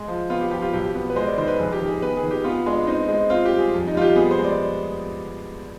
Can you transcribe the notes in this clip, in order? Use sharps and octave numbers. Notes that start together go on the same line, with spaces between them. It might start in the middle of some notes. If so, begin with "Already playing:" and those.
Already playing: G#3
F3
B3 F4
G4
F3 G4
F4
B1 G4
B3
B4
G#3 C5
D5
D#3 C5
B4
F1 G#4
G4
D#3
G#4
B3 B4
G#4
D#3
G4
B3 F4
G#3 D4
C4 D#4
G#3
C4 F4
G4
G3
G#4
F2
D#4
G3 F4
G4
B3 G#4
C5
G#3
D5